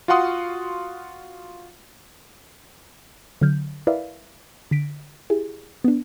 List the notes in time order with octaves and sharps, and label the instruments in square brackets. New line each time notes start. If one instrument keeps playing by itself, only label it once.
[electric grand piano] F4 F#4 F5 F#5 C6 D#6
[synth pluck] D3 F#3 F6 G6
E4 A#4 B4 D5 E5 F5
D3 A#6 B6 D7
E4 G4 G#4
B3 D4